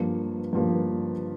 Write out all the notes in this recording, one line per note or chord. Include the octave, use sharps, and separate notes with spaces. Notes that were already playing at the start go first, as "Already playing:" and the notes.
Already playing: G2 F3 A#3
G2 F3 A#3